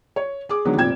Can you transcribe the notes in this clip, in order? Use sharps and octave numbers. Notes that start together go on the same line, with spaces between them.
C#5
G#4 D6
D3 D#3 F#3 G#3 B3
F1 A#2 C4 G5 G#6 E7